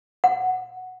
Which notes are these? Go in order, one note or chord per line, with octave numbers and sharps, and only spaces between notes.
F#5